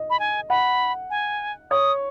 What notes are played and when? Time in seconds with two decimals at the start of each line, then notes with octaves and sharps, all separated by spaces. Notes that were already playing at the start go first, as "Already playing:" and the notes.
Already playing: D#5
0.10 B5
0.20 G#5
0.50 F#5 B5
1.10 G#5
1.71 C#5 D#6